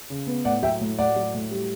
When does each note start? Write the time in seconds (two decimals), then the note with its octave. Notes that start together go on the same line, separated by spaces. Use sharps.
0.10 C#3
0.27 B3
0.45 A2 D5 F#5
0.62 F#3 E5 G5
0.81 A2
0.98 A2 D5 F#5
1.16 F#3
1.34 A2
1.51 G3